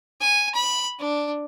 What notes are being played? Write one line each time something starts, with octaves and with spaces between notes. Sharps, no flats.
G#5
B5
D4